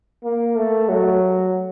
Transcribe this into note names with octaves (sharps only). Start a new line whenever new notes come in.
A#3
A3
F#3